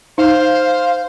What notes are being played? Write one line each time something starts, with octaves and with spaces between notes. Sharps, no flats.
D#4 C5 F5